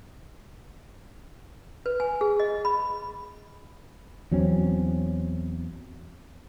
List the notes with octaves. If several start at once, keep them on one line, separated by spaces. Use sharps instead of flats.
B4
G#5
G#4
D#5
B5
E2 F#3 C4 C#4